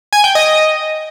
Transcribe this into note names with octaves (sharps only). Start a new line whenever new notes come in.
G#5
G5
D#5